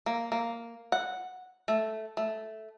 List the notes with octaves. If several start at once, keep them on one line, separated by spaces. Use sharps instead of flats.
A#3
A#3
F#5
A3
A3